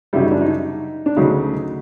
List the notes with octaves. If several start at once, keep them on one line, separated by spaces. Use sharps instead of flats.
F#2 C#3 E3 G3 E4
D#4
D4
D#4
D4
D2 C#3 F#3 D#4